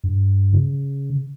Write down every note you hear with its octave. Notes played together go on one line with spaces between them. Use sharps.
G2
C#3